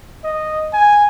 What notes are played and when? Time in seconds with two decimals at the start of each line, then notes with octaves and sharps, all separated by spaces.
0.24 D#5
0.74 G#5